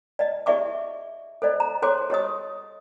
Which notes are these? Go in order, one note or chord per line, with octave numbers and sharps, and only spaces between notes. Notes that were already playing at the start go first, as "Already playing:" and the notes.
D5 D#5
G4 G#4 D5 E5 C#6 D6
A4 C5 D5 D#5
A#5
G#4 A4 C5 C#5 C6 D6
G4 C#5 D#5 D#6